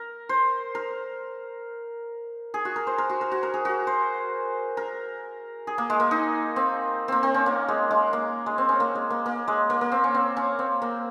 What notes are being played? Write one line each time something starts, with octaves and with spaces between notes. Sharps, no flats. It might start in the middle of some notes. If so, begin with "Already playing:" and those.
Already playing: A#4
C5
A#4
G#4
F#4
A#4
C5
A#4
F#4
A#4
F#4
A#4
G#4
F#4
C5
A#4
G#4
A#3
G#3
A#3
D#4
C4
A#3 C4
C4
C#4
A#3
G#3
G#3
A#3
G#3
C4
C#4
A#3
G#3
A#3
A#3
G#3
A#3
A#3
C4
C#4
C4
C#4
C4
A#3